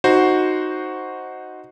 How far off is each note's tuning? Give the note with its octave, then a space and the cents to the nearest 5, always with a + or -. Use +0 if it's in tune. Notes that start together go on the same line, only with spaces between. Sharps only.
D#4 +0 F#4 +0 C5 +0